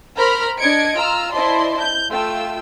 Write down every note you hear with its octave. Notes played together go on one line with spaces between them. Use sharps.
A#4 C5 A#5 B5 F6 A#6
D4 D#5 G#6 C#7 D7
F4 A#5 E6 F6
E4 C5 D5 D#5 A5 C6
G6
A3 F4 G5 E6